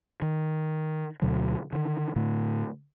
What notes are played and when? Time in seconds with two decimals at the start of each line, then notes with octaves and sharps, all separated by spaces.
0.22 D#3
1.22 D2 B2 D3 F#3
1.73 D3 D#3
2.16 A2 D3 A3